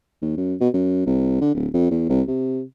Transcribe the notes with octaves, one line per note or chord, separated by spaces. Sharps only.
D#2
F#2
B2
F#2
C2
D3
D1
F2
E2
C2
C3